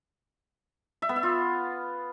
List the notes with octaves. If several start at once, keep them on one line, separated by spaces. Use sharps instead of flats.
E5
B3
E5
F4